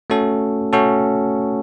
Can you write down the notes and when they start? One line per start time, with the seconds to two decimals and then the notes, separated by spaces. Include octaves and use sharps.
0.10 A3 C#4 F#4 A4
0.73 A3 C#4 F#4 A4